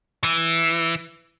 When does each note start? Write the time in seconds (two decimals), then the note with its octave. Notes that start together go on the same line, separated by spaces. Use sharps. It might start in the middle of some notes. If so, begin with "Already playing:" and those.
0.24 E3